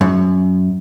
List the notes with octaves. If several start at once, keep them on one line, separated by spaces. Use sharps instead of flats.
F#2